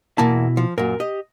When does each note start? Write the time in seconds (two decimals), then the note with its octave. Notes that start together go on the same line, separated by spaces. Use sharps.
0.18 E2 B2 A#3 E4 A5
0.57 F3
0.78 F#2 A#2 A#4
1.00 G4 D#5